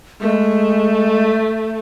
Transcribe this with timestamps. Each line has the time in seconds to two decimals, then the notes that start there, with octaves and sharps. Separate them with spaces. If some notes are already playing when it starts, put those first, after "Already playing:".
0.20 G#3 A3